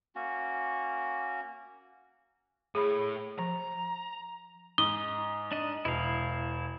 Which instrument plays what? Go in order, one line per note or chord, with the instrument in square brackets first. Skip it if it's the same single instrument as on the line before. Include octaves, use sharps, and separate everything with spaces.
[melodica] A#3 C#4 F#4
[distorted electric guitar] A2 [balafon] G#4 B5
[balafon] F3 [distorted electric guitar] A#5
[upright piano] G#2 [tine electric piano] D#6 [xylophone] G7
[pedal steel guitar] D4 D#5
[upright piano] E1 [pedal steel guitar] E4 F5